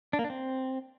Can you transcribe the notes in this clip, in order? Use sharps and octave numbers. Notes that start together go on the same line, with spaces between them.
D4
A#3
D4
C4